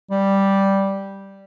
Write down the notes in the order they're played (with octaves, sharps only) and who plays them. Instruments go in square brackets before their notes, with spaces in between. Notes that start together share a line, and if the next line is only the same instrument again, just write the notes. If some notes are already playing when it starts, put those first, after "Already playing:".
[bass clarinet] G3